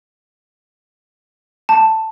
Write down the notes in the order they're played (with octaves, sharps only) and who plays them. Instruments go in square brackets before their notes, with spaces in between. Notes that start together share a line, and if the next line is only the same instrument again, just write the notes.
[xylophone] A5